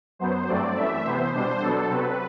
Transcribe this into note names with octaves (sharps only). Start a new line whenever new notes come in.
F#2 F#3 B3 C5
G2 F#3 A3 C4 D5
F#2 E3 A3 E5
C3 E3 B3 C5
B2 G3 D4 C5
B2 F#3 B3 D4 A4
C3 F#3 C4 B4